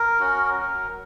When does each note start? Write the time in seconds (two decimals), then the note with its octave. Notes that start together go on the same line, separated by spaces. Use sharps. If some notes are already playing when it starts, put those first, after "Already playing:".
Already playing: A#4
0.20 C#4 F#4
0.58 F#3